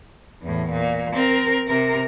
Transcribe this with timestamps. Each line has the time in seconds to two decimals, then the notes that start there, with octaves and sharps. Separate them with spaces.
0.42 E2 A2
0.71 A#2
1.14 C4 A#4
1.68 C3 A#4